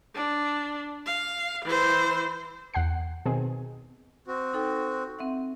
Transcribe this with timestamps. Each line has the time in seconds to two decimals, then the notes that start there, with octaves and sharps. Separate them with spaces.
0.15 D4
1.06 F5
1.65 E3 C5
2.74 E2 F#5 G5 C7
3.26 B2 D#3 C4 G#4
4.27 C4 F#4
4.53 D#4 A4 G5
5.19 C4 E5 F#5